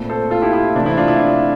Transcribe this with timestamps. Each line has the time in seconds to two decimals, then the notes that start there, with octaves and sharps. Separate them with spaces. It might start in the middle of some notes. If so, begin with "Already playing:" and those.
Already playing: A#2 A3 C4
0.09 A4 C5
0.31 F4 A4
0.42 E4 G4
0.53 E4
0.75 C3 E3 A3 C4 D4
0.86 E4
0.97 D4 F4
1.08 E4
1.19 D4